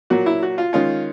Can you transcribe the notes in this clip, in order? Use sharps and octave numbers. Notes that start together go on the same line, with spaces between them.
A#2 F#3 A#3 F#4
E4
F#4
F4
D#3 G#3 C#4 F4